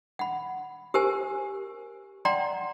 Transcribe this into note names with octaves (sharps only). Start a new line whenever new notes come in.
F#5 B5
G4 A#4 C5 G#5
D5 F#5 G5 A#5 C6